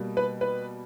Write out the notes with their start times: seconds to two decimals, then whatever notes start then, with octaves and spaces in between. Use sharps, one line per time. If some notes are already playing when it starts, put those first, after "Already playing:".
Already playing: B2 G3 A#3
0.17 B4
0.41 B4